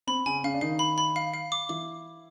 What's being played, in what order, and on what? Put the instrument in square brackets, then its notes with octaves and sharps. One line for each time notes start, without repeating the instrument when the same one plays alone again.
[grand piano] C4 [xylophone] B5
[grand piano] C#3 C#4 [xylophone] G#5
[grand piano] C#3 C#4 [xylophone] F5
[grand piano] D4
[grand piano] D#3 D#4 [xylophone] F5
[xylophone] B5
B5
F5
F5
D6
[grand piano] E3 E4 [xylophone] D6